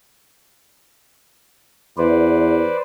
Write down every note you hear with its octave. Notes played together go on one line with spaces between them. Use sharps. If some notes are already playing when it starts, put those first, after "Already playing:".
E2 B4 C5 D5